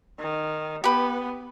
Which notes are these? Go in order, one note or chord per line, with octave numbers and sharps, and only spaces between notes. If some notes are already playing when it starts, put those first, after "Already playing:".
D#3
B3 G4 B4